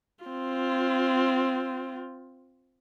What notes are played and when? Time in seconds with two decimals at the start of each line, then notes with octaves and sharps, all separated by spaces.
0.24 C4 F4